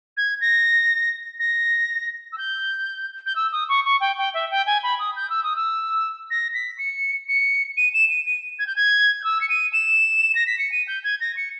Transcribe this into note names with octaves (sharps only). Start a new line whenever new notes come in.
G#6
A#6
A#6
E6
G6
G6
E6
D#6
C#6
C#6
G5
G5
E5
G5
G#5
B5
D#6
G6
E6
D#6
E6
A#6
B6
C#7
C#7
D#7
E7
D#7
D#7
G#6
G6
G#6
G6
E6
C#7
D#7
E7
A#6
B6
C#7
D#7
G6
G#6
A#6
C#7